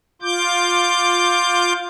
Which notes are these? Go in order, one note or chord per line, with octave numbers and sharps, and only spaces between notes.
F4 D6 G6